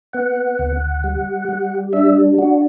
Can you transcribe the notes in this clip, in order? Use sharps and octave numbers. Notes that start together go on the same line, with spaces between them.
B3 F#5
D2
G3
G3
D4 E5
D4 F#4